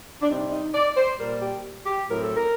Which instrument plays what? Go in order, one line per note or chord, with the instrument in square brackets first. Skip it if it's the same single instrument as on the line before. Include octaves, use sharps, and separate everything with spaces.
[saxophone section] D4
C3 G3 C4 D#4
D#4
D5
C5
A#2 G3 A#3 A#4
G4
G4
A2 F#3 C4 A#4
A4
A#4